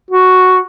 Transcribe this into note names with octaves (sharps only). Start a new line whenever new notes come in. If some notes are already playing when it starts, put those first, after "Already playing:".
F#4